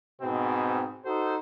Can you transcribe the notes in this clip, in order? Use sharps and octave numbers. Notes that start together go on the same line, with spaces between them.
G#2 B2 C4
D#4 F#4 A4 C5